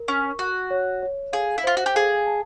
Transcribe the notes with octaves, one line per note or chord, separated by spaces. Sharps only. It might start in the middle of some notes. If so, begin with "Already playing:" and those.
Already playing: A#4
C#4 C#6
F#4 C#6
C#5
C#5
G#4 F5
E4
F4 C5
F#4
G4
G#4 F5
A5